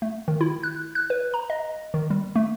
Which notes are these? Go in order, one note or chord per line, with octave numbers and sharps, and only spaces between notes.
A3
D#3
E4
F#6
F#6
B4
A#5
D#5
D#3
G3
A3